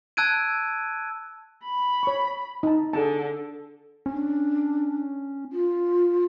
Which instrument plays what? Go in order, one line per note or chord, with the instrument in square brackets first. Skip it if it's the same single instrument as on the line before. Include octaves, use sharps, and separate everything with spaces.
[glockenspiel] A5 E6 F#6 G#6 D7 D#7
[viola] B5
[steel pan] C#5 C#6
D#4 A5
[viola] D3 [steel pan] G#4 A5
[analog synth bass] C#4 [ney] D4
[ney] F4